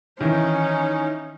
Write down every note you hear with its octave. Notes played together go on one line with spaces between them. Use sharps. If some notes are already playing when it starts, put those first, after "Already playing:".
D#3 E3 C#4 D#4